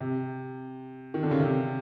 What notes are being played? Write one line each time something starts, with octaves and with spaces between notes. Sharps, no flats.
C3
D#3
D3
C#3
C3